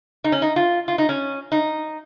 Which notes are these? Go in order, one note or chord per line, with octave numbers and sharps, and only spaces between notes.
D#4
C#4
D#4
F4
F4
D#4
C#4
D#4